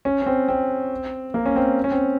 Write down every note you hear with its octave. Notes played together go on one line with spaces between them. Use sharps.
C#4
C#4
C4
C4
A#3
C#4
C4
C#4
C4